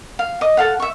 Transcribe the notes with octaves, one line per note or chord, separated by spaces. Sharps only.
F5
D#5 D6
A4 F5 F#5
E5 C#6